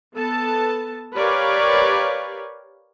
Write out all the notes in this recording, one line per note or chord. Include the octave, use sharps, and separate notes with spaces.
B3 A4 A5
G4 A#4 B4 C#5 D5 F5